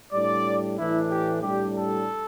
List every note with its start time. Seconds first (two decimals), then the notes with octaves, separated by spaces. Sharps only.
0.13 A2 G3 D4 D5
0.78 A2 E3 A3 D4 E4
1.11 G4
1.42 A2 G3 D4 G4
1.75 A4